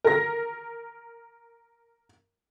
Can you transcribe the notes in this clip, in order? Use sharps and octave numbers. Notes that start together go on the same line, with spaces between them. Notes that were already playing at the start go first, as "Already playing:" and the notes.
A#4 A#6